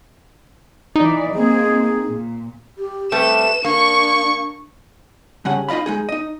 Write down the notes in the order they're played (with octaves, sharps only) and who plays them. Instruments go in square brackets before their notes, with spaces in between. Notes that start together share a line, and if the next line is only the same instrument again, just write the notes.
[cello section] E3 D5 [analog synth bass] D#4
[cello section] A#3 C4 [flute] G#4
[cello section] A#2
[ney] G4
[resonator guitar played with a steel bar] G3 A3 C4 [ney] B4 [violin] E7
[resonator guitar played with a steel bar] A#3 [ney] D4 [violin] C#6
[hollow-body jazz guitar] G2 C#3 C#4 F#5
D#4 F4 D#5 F5 B5
G#3 D#4 G#4
D#4 D#5